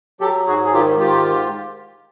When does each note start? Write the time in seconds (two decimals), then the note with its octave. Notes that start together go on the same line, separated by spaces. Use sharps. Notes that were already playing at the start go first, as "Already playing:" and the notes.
0.21 F#3 G4 A4
0.47 G#2 F#4 G#4
0.64 G#4
0.73 D#3 F4 G4
1.00 G#2 F4 G4